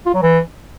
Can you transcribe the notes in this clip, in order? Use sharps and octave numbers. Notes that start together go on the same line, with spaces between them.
F4
F#3
E3